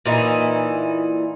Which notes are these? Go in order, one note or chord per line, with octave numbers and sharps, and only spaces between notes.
A#2 E3 D#4 E4